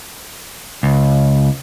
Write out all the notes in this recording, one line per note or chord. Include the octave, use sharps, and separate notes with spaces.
C#2